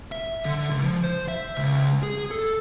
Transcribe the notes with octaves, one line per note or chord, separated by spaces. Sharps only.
E5
D3
C#2
F3
C5
E5
C#2
G#4
A4